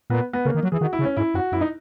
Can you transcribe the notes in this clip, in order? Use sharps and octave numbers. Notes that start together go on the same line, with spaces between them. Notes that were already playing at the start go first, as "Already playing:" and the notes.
A#2 B3
B3
C#3 A#3
D#3
F#3
E3 G#4
D#3 F#4
E4
C#3
C#4
G#2 E4
F#2 F#4
F#2 E4
D#4